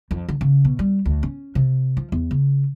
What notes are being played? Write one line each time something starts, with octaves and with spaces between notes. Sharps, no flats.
F2
D3
C#3
B2
G3
D2
C#4
C3
F3
E2
C#3